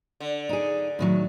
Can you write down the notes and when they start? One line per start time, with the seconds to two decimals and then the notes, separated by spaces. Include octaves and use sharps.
0.20 D3
0.49 D#4 G#4
0.99 A2 D#3 F#3